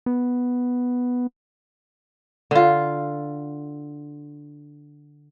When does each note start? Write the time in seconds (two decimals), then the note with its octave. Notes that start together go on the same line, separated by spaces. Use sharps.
0.06 B3
2.51 D3 F4